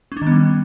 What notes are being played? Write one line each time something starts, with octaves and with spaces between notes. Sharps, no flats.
C#4
D4
D#3
B3
G3